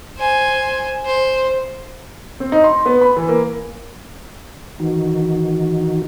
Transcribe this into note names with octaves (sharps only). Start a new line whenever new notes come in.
C5 G#5
C5
C4
D#4
C6
B3
B5
E3
A#3
D#3 E3 D#4 F#4